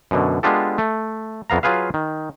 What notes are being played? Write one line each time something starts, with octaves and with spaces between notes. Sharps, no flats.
F#2 B2 D3
G#3 B3 D4 F4 G4 A4
A3
F2 B3 F5 A#5
F#3 F4 G#4 B4 F5
D#3